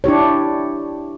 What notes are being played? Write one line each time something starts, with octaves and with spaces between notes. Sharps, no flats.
D4 E4 G4 C#5